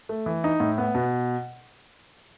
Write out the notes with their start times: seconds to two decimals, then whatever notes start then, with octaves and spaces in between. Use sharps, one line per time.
0.09 A3
0.26 E3
0.44 D#4
0.60 A2
0.78 B3
0.95 B2